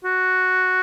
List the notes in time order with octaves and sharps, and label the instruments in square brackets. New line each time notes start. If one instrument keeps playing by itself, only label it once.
[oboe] F#4